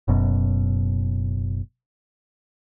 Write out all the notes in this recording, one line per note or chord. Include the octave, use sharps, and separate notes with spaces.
F#1 F#2 B2